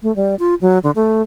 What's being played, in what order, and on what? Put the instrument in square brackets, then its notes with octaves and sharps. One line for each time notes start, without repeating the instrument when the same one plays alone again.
[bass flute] A3
G3
F4
F#3
D3
A3